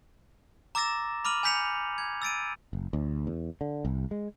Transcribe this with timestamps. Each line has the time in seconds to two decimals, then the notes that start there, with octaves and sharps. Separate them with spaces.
0.75 A#5 D6 E6 A6 A#6 E7
1.25 B5 D6 F6 D#7 F#7
1.43 G#5 B5 G6 B6 C#7 F7
1.98 G#6
2.22 E6 A6 D7 D#7
2.73 F#1
2.93 D2
3.27 E2
3.61 D3
3.85 C2
4.11 G#3